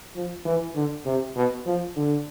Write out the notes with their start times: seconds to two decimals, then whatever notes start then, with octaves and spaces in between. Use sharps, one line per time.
0.15 F3
0.45 E3
0.75 D3
1.05 C3
1.35 B2
1.66 F3
1.96 D3